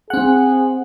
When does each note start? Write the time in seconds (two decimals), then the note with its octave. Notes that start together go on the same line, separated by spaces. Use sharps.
0.10 C4 G#4 F#5